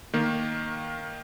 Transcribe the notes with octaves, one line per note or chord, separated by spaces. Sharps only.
D#3 A#3